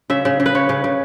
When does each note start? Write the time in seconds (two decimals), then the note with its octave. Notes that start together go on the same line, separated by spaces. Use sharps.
0.10 C#3 E5
0.25 C#3
0.40 C#3
0.46 B4
0.55 C#3 C#5
0.69 C#3
0.84 C#3